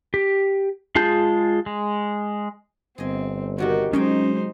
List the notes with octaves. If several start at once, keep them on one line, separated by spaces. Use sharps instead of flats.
G4
G#3 F4 G#4 A5 G6
G#3
G1 C4 G#4 D#5
C3 D#3 D#4 F#4 G4
F#3 G#3 C#4 D#4 G#4 C5 D#5 G5